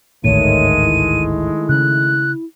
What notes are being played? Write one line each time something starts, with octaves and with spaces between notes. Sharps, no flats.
G#1 D2 A2 D#3 G#3 A3 C#5 D#7
E4
C#3 F#6